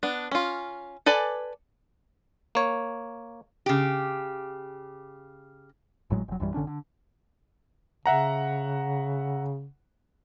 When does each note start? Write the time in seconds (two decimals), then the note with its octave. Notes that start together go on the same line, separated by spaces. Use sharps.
0.03 B3 D4
0.31 C#4 F4
1.06 A4 B4 D5 G#5
2.55 A#3 C#5
3.66 C#3 G4
6.10 G#1 A2 F#3 G#3
6.28 F1 F#3
6.40 A#1 F#2 E3 G3
6.54 G1 D3 C#4 D4
6.67 D3
8.06 C#3 E5 F#5 A#5